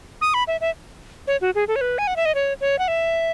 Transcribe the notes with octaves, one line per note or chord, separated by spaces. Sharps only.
D#6
B5
E5
E5
C#5
F#4
G#4
A4
C#5
B4
G#5
F#5
E5
D#5
C#5
C#5
F#5
E5